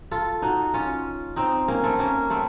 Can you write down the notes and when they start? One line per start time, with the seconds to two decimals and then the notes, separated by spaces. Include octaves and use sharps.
0.11 F4 A4
0.42 D#4 F#4
0.74 C#4 F4
1.36 C4 D#4
1.68 A#3 C#4
1.83 A3 C4
1.99 A#3 C#4
2.30 A3 C4